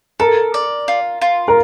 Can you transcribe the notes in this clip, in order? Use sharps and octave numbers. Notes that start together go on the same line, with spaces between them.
A4 A#4
D5
F4
F4
A#4